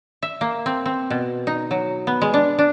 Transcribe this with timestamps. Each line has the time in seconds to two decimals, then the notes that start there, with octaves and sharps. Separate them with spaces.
0.22 E5
0.41 A#3
0.66 C4
0.86 C4
1.10 B2
1.47 D#4
1.71 F#3
2.07 B3
2.22 G#3
2.34 D4
2.58 D4